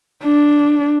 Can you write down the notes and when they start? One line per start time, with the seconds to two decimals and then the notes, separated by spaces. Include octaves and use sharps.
0.24 D4